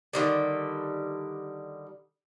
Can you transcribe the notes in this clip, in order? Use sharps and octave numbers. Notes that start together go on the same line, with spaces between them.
D3 D#3 G3